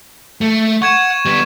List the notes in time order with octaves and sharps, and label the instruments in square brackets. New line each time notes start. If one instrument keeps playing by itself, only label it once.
[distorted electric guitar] A3
[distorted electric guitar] F#5 [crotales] C#6 G#6 E7
[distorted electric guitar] G3 B3